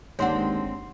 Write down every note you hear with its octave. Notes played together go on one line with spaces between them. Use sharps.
G1 D#2 G#3 C4 D4 C#5 F#5 C6